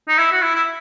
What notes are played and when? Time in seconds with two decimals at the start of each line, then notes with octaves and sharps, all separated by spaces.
0.08 D#4
0.19 E4
0.32 F#4
0.42 E4
0.55 E4